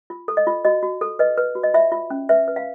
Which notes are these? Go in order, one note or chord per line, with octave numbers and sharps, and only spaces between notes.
F4
A4
D#5
F4
F#4 D#5
F#4
A4
B4 D#5
B4
F#4
D#5
F4 E5
F4
C#4
B4 E5
B4
F5